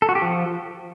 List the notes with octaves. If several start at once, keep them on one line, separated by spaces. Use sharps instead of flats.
A4
F#4
G4
F3